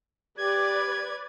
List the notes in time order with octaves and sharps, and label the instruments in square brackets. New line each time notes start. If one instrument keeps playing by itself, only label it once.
[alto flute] G4 [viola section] B4 D5 [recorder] G#6